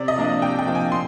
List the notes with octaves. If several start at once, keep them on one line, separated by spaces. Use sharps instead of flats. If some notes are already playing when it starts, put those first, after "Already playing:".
Already playing: C3 D5
D#5
F3 A#3 D4
C3 G5
G5
F3 A#3 D4
G#5
A#2 C6